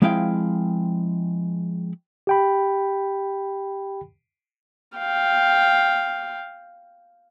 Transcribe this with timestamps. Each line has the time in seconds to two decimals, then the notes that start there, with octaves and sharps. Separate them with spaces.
0.02 F3 G#3 C4 E4 F5 G5
2.27 G4 G5 B5
4.98 F5 G5